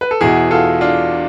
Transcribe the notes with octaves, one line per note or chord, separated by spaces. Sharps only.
B4
A4
E2 B2 E4 G#4
F4 A4
D4 F4